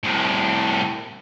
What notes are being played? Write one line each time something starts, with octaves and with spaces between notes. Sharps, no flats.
C2 A2